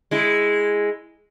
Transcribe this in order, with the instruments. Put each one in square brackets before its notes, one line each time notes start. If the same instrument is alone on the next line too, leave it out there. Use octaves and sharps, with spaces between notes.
[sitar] G#3 E4